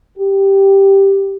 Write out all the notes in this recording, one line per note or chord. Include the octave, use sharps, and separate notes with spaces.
G4